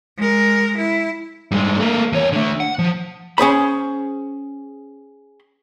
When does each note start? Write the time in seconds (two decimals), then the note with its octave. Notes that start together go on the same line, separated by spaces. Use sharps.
0.17 G#3 A#4
0.77 E4
1.51 G2 G#3
1.80 A3 A#3
2.13 E2 C#5
2.33 D3 A3
2.60 F#5
2.79 F3
3.38 C#4 G#4 C5 B5